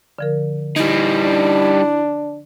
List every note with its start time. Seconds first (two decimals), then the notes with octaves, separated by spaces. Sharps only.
0.19 D3 F3 A#4
0.76 G3 D#4 E4
1.25 D4